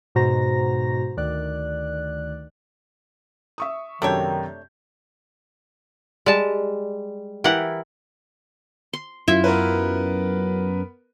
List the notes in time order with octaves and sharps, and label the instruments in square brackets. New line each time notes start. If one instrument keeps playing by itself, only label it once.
[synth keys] G#2 B2 F#4 C5 A#5 A#6
D2 D#3 D5 F#6
[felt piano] E5 C#6 D#6
[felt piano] F#2 C3 G6 [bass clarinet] D#3 [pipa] A3 D4 C#5
[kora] G3 [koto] G#3 A5
[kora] E3 E4 A#4 [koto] G4 F#5
[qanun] C6
[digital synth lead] F#2 [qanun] E4 F4 E5
[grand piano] B3 A#4 B4